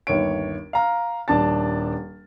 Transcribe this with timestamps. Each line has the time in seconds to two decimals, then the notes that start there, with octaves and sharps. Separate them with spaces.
0.07 G1 D#2 C#5 D7
0.73 F5 A#5 F6
1.28 D#1 D4 A5 A6